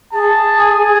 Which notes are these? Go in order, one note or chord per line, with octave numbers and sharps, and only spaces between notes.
G#4 A5
G#5